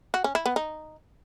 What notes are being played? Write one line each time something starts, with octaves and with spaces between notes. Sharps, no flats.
F#4
C#4
E4
B3
D#4